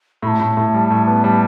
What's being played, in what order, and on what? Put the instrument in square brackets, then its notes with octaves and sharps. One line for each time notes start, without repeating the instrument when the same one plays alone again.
[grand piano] A2 [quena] B5
[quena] A5
[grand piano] A2
A2
G3
A2
B3
G3